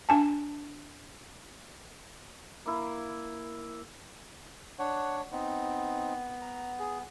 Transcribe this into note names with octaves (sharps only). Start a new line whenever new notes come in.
D4 G#5 A5
A#3 E4
D4 C#5 F#5
B3 C4 D#4
A#5
G#4